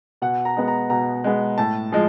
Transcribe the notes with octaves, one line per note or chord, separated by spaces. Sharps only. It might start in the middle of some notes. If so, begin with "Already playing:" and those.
B2 F#5
A#5
G#3 B3
A#5
B2 A#5
G#3 B3
A2 A5
F3 G#3